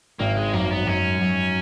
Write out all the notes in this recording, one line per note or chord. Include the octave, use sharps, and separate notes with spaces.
G#1 A#3
G#3
F#2 A#3
B3
F#2 C#4
F#2